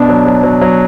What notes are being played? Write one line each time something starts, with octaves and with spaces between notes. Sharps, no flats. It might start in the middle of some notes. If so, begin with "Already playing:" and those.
Already playing: B2 B3 D4
F#3
F#3
F#3
F#3